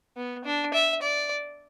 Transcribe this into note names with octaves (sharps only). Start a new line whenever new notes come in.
B3
D4
E5
D5